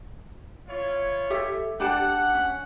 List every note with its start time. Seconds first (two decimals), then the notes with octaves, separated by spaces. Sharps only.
0.68 E4 F4 C#5
1.30 G4 A4 E5
1.80 D4 G4 F#5 A5
2.35 C#4